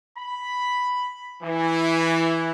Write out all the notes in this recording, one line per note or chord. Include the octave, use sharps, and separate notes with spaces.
B5
E3